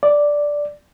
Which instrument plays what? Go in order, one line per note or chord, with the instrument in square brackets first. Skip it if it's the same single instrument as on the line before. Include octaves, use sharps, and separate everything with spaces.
[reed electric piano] D5